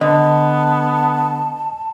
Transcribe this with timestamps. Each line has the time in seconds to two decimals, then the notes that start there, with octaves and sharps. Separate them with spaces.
0.01 D3 B3 D#5 A5